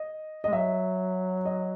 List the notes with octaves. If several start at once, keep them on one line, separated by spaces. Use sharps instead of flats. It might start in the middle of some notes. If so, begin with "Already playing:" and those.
Already playing: D#5
D#5
G#3
F#3 E5
D#5